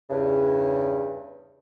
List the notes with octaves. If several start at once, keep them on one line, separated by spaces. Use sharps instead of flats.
E2 G2 C#3